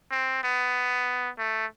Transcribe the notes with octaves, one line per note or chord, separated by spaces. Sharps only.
C4
B3
A3